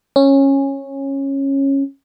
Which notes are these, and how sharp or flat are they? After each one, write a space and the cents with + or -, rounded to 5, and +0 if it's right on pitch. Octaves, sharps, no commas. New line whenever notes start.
C#4 -15